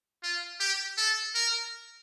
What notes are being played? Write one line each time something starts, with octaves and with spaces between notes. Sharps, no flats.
F4
G4
A4
A#4